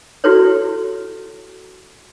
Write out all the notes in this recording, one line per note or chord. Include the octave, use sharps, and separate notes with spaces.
E4 F#4 G4 A4 B4 C#5